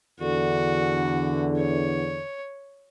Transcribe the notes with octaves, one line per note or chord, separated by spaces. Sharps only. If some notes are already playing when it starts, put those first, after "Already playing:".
E2 D3 F#4
C#5